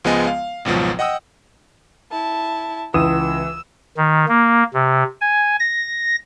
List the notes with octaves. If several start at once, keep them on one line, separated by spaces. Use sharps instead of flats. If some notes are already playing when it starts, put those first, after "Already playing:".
C#2 F3 G#3 B3 D#5 G#5
F5
G#1 C#2 B2 F3 F#3
D#5 F#5 G5 D#6 E6
E4 A5
C#2 E3 D#6 E6 E7
D#3
A#3
C3
G#5
A#6